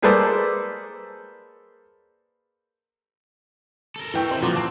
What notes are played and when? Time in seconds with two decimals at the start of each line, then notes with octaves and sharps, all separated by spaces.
0.02 A#3 G#4 A4 B4 C5 D5
3.96 A4 A#4
4.14 E3 E4 G5 C#6
4.31 C3 C5
4.42 A#2 F3 F#4
4.56 C4 A5